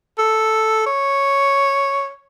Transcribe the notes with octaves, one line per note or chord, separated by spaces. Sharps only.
A4
C#5